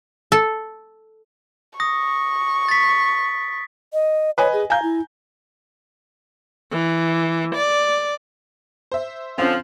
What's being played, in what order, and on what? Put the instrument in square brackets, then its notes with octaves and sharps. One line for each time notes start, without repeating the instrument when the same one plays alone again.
[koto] A4
[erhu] C#6 [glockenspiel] D#6 A#6
[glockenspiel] A6 B6
[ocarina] D#5
[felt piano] B4 D#5 G#5 [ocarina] C#5
[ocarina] G#4
[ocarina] F5 [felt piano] G#5 A#5 G6
[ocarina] E4
[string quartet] E3
D5
[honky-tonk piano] C5 E5
[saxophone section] D3 F3 [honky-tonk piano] C4 C#4